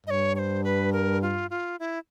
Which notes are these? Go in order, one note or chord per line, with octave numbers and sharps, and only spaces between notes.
G2 C#5 D#5
C#5
C5
B4
A#4
F4
F4
E4